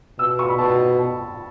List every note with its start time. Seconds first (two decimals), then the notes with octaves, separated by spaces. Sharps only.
0.19 B2 E6
0.39 C#6
0.48 B5
0.58 B2 A5